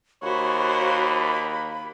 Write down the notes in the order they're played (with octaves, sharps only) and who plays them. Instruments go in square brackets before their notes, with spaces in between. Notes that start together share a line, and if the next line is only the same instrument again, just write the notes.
[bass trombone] D#2 [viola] F#4 C5 [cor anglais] C#5 [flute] B5